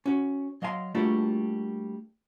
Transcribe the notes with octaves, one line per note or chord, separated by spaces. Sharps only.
C#4 F#4
F#3 D#5 F5 G#5 C6
G3 A3 A#3 D4 F4 F#4